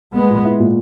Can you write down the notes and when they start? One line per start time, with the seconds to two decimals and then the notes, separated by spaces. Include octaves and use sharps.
0.14 G#3 A#3 B3
0.30 A#2
0.45 E4
0.59 A#2